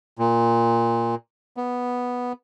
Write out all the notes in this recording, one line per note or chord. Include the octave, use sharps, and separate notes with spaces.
A#2
B3